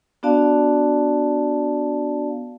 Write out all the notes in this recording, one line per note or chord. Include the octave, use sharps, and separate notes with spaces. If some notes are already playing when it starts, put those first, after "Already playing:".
B3 D4 F#4 D5 F5 A5